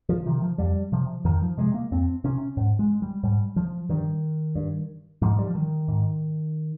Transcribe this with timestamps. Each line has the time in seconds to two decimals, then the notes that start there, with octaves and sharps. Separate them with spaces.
0.09 F3
0.26 C3 D#3
0.42 F3
0.58 F2 G3
0.92 C3 F3
1.25 F2 D#3
1.42 F3
1.58 C3 G#3
1.74 A#3
1.92 F2 C4
2.24 C3 C#4
2.57 G#2
2.79 G#3
3.02 G3
3.23 G#2 G3
3.56 F3
3.89 G2 D#3
4.55 G2
5.22 G#2 F3
5.39 G3
5.47 F3
5.55 D#3
5.88 G#2